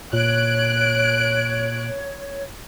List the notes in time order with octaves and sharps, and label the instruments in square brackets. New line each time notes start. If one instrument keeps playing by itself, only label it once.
[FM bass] A#2 [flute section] C#5 [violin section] F#6 D7